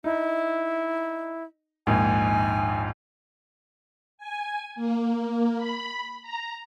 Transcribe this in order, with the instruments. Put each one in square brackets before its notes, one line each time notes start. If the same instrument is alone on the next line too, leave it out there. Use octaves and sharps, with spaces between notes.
[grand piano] D#4 [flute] E4
[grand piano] A#1 D#2 G#2 [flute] G#5
[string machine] G#5
A#3
B5
A#5